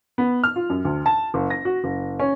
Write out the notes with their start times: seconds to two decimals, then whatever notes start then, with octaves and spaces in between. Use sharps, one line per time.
0.18 B3
0.44 F6
0.56 F4
0.70 F#2
0.85 D2
1.06 A5
1.34 F#1
1.50 A#6
1.65 F#4
1.84 F#1
2.20 C#4